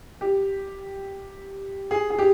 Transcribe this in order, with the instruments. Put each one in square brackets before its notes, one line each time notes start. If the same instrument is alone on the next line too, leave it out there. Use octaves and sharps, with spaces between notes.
[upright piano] G4
G#4
G#4
G4